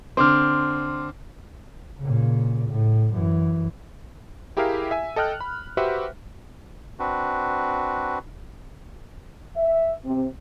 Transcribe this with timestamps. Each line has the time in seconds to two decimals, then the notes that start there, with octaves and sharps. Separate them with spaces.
0.17 D3 C4 C6 D6 F6
2.01 A#2 C#3
2.71 A2
3.14 F#2 E3
4.57 E4 G4 G#4 A#4 E5 F5
4.91 E5 G#5
5.16 A4 D#5 G5 F6 F#6
5.41 B5
5.77 F#4 G4 B4 C5 E5 F#5
6.99 C4 D4 F#4 B4
9.57 E5
10.05 C3